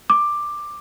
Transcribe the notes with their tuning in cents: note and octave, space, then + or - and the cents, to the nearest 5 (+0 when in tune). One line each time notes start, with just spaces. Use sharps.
D6 +10